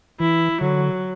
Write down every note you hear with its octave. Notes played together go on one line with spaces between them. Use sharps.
E3 E4
D3 F#3